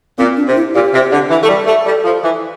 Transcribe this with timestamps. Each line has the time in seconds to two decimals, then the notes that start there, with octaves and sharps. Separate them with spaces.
0.18 A#2 C4
0.37 D4
0.46 C3
0.56 E4
0.74 A#2 G4
0.93 C3
1.11 D3
1.29 E3
1.42 A3
1.48 G3
1.66 A3
1.85 G3 A4
2.04 F3
2.23 E3